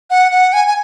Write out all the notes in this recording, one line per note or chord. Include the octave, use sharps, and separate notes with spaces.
F#5
F#5
G#5
G#5